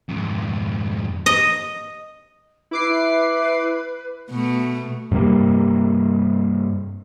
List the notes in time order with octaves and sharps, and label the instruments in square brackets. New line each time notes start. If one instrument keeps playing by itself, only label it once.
[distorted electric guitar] F2 G#2
[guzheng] D#5
[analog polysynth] E4 D6 C7 [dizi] B4
[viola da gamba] B2 A3
[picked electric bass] G2 C3 G3 A#3